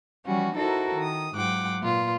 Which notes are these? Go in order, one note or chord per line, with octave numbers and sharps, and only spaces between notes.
E3 F3 G3 C#4 F#4
D#4 E4 F#4 A4 A#4 C5
D#3 D#6
G#2 F#3 F4 F#5 G5 D6
A#2 F4 B4